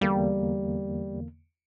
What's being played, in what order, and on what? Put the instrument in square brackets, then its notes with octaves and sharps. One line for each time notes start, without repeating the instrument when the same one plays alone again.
[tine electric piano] E2 D3 A#3 [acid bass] G3